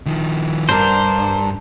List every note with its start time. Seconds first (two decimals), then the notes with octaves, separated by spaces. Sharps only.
0.06 D#3 F3
0.69 G2 D4 A#4 C5